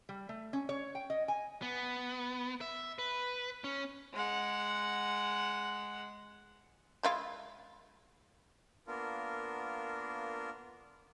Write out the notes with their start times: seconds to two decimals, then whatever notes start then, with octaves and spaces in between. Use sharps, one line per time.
0.09 G3
0.29 A3
0.53 C#4
0.69 C#5
0.95 G5
1.10 D#5
1.28 G#5
1.62 B3
2.61 E5
2.99 B4
3.64 C#4
4.13 G#3 F#5
7.03 G#3 E4 F4
8.87 A#3 B3 D4 F4 A#4